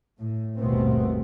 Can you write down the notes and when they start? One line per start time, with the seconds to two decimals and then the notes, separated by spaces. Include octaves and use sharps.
0.19 A2
0.57 G1 D#2 B2 A3 B3 C4